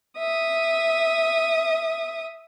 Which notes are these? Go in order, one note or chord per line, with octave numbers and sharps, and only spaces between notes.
E5 D#6